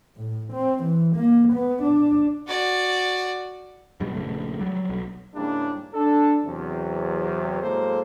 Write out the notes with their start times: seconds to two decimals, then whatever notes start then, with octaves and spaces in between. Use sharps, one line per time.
0.16 A2
0.53 C4
0.84 E3
1.16 A#3
1.53 B3
1.83 D4
2.48 F#4 D5
4.00 F#2 B2 G3
4.15 A#1 C#3 A3
4.59 F#3 G3
4.90 B1
5.35 G#2 C#3 G3 A#3 D4 E4
5.94 D4 A4
6.45 E2 C3 F#3
7.62 A2 F#3 G#3 A#3 A4 C5